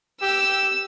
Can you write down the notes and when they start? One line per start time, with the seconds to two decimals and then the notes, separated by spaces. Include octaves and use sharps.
0.22 G4 E6